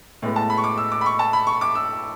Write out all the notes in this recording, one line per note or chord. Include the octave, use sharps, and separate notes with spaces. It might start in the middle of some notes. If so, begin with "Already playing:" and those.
A2 G#3 B3
A5
B5
C#6
D6
E6
D6
B5
C#6
A5
B5
C#6
D6
E6